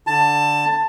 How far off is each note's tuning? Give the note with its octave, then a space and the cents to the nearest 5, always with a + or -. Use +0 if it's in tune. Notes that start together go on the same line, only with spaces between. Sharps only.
D3 -5 A5 +15